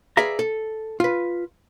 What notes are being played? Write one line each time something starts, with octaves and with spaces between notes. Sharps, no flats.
G#4 B4 D5 E5 F5 A#5
A4
F4 B4